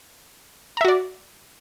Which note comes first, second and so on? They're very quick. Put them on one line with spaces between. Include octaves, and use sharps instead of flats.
A#5 E5 F#4 D5